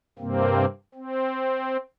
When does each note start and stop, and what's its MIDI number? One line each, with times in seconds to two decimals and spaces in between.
0.19 0.65 43
0.19 0.65 48
0.19 0.65 58
0.19 0.65 60
0.94 1.77 60